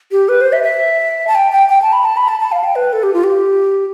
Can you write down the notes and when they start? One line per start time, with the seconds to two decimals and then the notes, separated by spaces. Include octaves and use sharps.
0.12 G4
0.29 B4
0.41 C5
0.53 E5
0.64 E5
1.27 A5
1.35 G5
1.52 G5
1.69 G5
1.82 A5
1.93 B5
2.05 A5
2.17 B5
2.28 A5
2.40 A5
2.52 F5
2.64 G5
2.75 B4
2.93 A4
3.03 G4
3.14 F4
3.24 G4